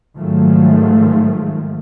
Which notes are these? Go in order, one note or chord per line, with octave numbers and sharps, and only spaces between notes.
G#2 D#3 F3 F#3 G#3 A3